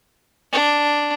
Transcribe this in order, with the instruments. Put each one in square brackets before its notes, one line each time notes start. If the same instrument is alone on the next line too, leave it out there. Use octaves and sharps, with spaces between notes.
[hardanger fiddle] D4